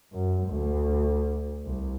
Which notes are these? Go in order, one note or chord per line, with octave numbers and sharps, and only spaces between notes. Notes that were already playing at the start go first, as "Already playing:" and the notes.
F#2
D2
C2